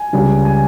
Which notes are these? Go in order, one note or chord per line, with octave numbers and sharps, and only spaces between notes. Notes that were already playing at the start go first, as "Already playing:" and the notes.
Already playing: G#5
C#2 C#3 G3
G#5